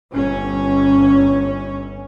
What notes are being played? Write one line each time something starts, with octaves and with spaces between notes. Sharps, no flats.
G1 C#4